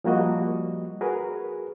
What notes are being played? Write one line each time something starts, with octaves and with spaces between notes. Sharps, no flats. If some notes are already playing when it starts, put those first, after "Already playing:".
F3 G3 A#3 F#4 D#5
F#4 G#4 A#4 B4